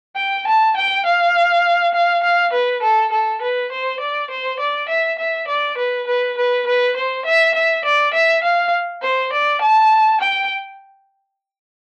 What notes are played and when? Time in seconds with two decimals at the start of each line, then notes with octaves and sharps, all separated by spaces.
0.16 G5
0.47 A5
0.76 G5
1.06 F5
1.94 F5
2.23 F5
2.53 B4
2.82 A4
3.12 A4
3.41 B4
3.71 C5
4.00 D5
4.30 C5
4.60 D5
4.89 E5
5.19 E5
5.48 D5
5.78 B4
6.07 B4
6.37 B4
6.67 B4
6.96 C5
7.25 E5
7.55 E5
7.84 D5
8.14 E5
8.44 F5
9.02 C5
9.33 D5
9.61 A5
10.21 G5